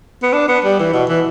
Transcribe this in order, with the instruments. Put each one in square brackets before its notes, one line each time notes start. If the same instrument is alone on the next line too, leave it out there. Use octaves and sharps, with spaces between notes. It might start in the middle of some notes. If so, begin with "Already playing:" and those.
[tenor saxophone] B3
D4
B3
G3
E3
B2
E3